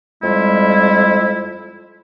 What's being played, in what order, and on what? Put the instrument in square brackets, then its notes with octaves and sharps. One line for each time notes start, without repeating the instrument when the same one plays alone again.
[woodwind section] F2 G3 G#3 E4